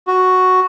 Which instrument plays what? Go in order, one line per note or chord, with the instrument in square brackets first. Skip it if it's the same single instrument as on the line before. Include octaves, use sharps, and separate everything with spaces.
[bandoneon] F#4